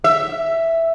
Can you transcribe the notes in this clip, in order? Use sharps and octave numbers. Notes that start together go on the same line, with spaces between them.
E5